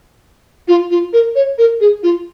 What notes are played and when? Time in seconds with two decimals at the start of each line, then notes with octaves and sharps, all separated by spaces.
0.68 F4
0.91 F4
1.13 A#4
1.35 C#5
1.58 A#4
1.81 G#4
2.03 F4